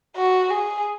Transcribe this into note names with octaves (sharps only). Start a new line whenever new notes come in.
F#4
G#4